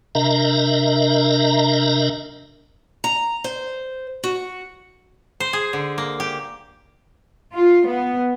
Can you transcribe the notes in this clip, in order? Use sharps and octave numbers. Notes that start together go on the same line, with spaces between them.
C3 D4 A#4 D#5 E5 A#5
A#5
C5
F#4
C5
G#4
D3
A#3
G4
F4
B3